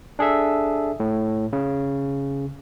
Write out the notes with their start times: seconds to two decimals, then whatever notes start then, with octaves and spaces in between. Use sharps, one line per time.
0.19 D4 G#4 A4 E5
1.00 A2
1.53 C#3